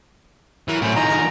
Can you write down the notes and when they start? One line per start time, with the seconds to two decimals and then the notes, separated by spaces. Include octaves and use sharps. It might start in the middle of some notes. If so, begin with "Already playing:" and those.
0.68 E3 F#3 A#4
0.82 A2 F#3 C4 C#4
0.96 D#3 F3 G#4 D#5 A#5
1.08 D3 A#4